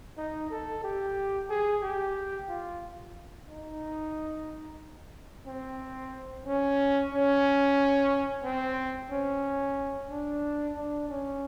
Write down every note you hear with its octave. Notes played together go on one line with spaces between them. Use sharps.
D#4
A4
G4
G#4
G4
F4
D#4
C4
C#4
C#4
C4
C#4
D4
D4
C#4